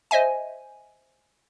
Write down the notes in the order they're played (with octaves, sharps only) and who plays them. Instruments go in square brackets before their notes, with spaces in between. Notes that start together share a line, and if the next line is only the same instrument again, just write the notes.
[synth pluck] C5 D#5 E5 G#5